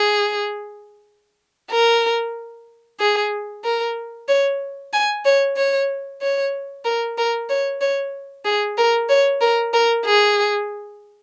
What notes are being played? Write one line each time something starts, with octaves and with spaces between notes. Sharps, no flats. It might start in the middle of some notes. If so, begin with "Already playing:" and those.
Already playing: G#4
A#4
G#4
A#4
C#5
G#5
C#5
C#5
C#5
A#4
A#4
C#5
C#5
G#4
A#4
C#5
A#4
A#4
G#4